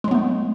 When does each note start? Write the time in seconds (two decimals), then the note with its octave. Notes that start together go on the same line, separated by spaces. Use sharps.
0.04 G#3
0.08 F#3
0.11 B3
0.15 A3